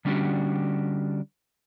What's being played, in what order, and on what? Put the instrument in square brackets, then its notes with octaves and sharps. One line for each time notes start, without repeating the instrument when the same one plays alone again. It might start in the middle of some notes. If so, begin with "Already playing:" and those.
[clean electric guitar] D3 G3 C#4 D4 F#4 G4